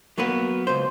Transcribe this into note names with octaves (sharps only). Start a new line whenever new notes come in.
F#3 A#3 B3 B4
C#2 C5